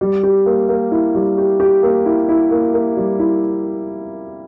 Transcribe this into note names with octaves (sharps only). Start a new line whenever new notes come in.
G3
G4
A#3
A#3
E4
G3
G4
G4
A#3
E4
E4
A#3
A#3
G3
E4